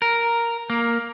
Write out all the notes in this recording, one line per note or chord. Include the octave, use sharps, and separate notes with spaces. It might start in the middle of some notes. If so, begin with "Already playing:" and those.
A#4
A#3